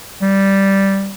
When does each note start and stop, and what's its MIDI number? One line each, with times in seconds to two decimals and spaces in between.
0.22 1.15 55